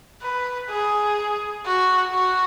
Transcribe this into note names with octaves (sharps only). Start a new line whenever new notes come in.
B4
G#4
F#4
F#4